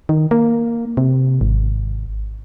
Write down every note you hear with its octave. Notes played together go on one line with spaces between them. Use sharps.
D#3
A#3
C3
G#1